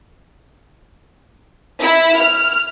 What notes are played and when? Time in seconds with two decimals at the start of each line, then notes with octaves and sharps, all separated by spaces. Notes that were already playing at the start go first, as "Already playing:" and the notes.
1.82 E4
2.20 F6